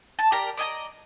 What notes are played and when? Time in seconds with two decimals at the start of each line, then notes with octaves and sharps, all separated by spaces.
0.19 A5
0.32 G4 A#4 D5 A#5
0.57 D5 D#5 G#5 A#5